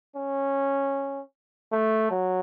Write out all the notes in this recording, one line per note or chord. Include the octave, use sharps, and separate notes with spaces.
C#4
A3
F#3